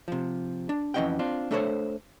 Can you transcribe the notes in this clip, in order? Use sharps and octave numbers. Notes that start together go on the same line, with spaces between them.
C3 F3
D4
F2 E3 C#4 D#5 F#5 G5
C4 D4 F4
A3 D4 A4 A#4 C5 C#5